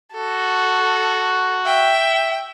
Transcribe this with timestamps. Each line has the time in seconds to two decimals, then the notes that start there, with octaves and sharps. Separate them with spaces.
0.13 F#4 A4
1.66 E5 G5